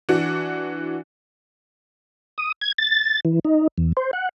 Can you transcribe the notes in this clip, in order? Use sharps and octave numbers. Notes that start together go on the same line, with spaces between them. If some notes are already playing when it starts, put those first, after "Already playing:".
E3 D4 F#4
D#6
G#6
A6
E3
D#4
E2
C5
F#5